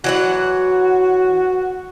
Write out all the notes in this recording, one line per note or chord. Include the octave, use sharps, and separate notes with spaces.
E3 F#3 F#4 F#5